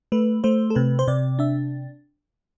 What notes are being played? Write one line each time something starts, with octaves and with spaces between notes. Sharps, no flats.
A3 B4
A3 C5
A4
C3 B4
C5
C3 D5
D4 E5